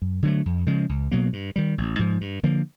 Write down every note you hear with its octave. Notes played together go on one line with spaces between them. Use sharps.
F#2
D3 F#3 A3
F2
C#3 F3 G#3
C#2
B2 F#3 A#3
G2
D#3 G3
A1
G#2 F3
G2
D3 F3 A#3